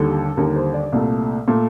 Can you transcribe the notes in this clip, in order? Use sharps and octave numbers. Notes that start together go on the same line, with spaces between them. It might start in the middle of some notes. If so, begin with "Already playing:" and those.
Already playing: D#2 D3 G3 A4
D#2 D3 G3 A#4
C5
D5
C2 A#2 A3
A#2 A3